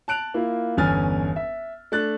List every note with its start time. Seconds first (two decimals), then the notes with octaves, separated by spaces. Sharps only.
0.08 A5 F#6 D7 F7
0.34 A#3 E4 F4
0.77 G1 E2 C#4 G#5 F6 A6
1.36 E5
1.92 A3 D4 F#6 A6